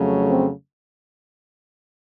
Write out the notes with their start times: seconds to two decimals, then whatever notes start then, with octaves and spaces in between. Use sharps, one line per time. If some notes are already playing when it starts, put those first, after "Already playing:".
Already playing: F2 C#3 F#3 A3
0.29 C4